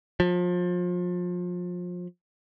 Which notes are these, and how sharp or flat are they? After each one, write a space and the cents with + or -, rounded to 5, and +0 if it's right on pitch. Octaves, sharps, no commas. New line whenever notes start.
F3 +30